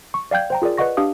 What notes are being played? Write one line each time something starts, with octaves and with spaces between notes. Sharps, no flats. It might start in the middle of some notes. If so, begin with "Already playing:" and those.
C#6
D5 F5 G5 G6 G#6
C5 G5 A#5
F4 G#4 A#4 D5
B4 D5 D#5 F#5 C#6 A#6
D4 G4 F5 D#6